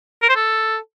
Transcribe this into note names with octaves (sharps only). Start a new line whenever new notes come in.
A#4
C5
A4